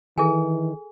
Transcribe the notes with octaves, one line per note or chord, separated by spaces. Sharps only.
D#3 E3 G#4 A4 G#5